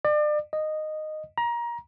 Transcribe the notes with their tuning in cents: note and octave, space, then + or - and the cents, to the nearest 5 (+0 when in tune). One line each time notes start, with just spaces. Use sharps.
D5 +35
D#5 -10
A#5 +25